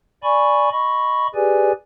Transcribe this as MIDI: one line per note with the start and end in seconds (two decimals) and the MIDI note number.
0.23 0.69 74
0.23 0.69 80
0.23 0.69 83
0.23 0.69 85
0.72 1.27 75
0.72 1.27 83
0.72 1.27 85
1.35 1.72 67
1.35 1.72 68
1.35 1.72 71
1.35 1.72 74
1.35 1.72 80